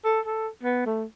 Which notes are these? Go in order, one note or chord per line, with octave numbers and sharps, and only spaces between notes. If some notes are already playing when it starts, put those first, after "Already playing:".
A4
A4
B3
A3